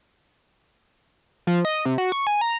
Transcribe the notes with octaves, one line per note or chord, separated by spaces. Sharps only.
F3
D#5
C3
F#4
C#6
G#5
A#5